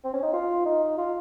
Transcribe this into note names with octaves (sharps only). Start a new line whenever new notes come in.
C4
C#4
D#4
F4
D#4
F4